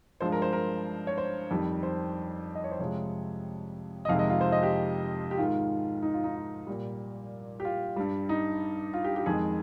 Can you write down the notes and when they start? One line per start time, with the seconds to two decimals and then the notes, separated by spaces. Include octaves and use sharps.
0.20 G2 F3 G#3 C5
0.32 A#4
0.42 C5
0.53 A#4
1.07 C#5
1.18 C5
1.51 F2 D#3 G3
1.83 C5
2.55 D#5
2.64 C#5
2.71 C5
2.79 F2 C3 F3 G#3 C#5
4.05 D#5
4.09 F2 C3 D#3 G#3 F5
4.19 D#5
4.30 F4
4.41 C5
4.52 D#5
4.63 G4
5.31 G4
5.38 G#2 D#3 G#3 F4
6.02 D#4
6.14 F4
6.24 D#4
6.35 F4
6.67 A#2 G3
7.60 G4
7.65 F4
7.96 G2 G3
8.29 D#4
8.94 F4
9.04 G4
9.16 G4
9.26 F2 D#3 G#3 G#4